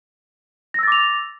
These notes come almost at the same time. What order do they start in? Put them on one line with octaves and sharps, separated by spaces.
A#6 E6 A6 D6 F7